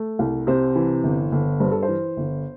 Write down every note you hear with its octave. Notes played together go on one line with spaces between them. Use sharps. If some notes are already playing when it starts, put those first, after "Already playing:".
Already playing: A3
C2
C3 C5
E3
G1
G1
G2 C5
A4
C5
E3
G1